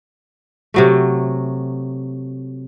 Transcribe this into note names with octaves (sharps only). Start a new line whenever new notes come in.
C3 F#3 A3